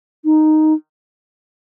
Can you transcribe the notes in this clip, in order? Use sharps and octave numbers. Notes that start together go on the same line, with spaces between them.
D#4